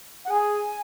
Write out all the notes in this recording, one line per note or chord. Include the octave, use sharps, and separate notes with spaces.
F#5
G#4 G#5